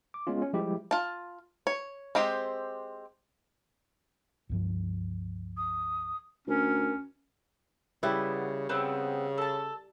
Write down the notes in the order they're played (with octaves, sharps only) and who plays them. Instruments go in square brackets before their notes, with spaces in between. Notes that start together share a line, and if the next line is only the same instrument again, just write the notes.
[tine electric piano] D6
G#3 B3 C#4 F4
C#4
F3 G3 G#3 E4 G4
[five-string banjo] F4 A5
C#5
G#3 C4 G4
[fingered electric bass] C#2 G2 F3
[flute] D#6
[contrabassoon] D2 [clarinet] C#4 [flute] A#4
[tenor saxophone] C#3 [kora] G3 E4 [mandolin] B3
[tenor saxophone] C#3 [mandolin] B3 C4
[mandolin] A4 A5